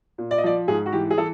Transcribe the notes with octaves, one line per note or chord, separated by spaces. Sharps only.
A#2
D5
D#5
F3 D5
G#2 G#4
F#4
E3 G4
G#4
E3 A4